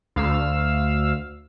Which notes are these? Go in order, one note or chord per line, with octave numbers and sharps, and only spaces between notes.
D2 F5 E6